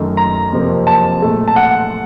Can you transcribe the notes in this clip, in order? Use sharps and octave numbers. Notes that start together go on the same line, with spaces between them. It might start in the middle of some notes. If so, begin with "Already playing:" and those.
Already playing: F#2 D#3 A3
A#5
F2 C3 F3 A#3
A5
A#2 A3
A5
F#5